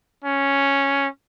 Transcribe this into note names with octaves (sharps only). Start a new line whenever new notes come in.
C#4